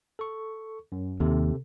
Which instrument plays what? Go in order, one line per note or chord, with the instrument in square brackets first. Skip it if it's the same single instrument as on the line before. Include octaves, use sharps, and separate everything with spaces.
[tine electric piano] A4 C#6
F#2
[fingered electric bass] D#2 [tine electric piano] C3 A4